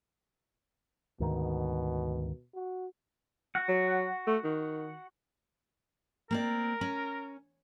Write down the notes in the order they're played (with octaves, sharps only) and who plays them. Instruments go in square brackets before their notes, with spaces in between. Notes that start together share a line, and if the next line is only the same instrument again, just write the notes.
[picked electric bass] D2 G#2 D#3 [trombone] B2
[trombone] F#4
[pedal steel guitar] F#4 F#5
[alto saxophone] F#3
A3
D#3
[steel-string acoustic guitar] A#3 C4 D5 [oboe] A#4
[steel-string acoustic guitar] C#4